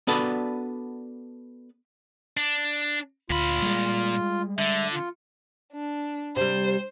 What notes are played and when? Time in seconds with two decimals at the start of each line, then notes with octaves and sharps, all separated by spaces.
0.07 B3 D4 F#4 A4 B4 D5
2.37 D4
3.30 D2 A#2 F4 B5
3.62 G3 G#3
4.58 D3 E5
4.92 F4
5.72 D4
6.36 C3 G3 C5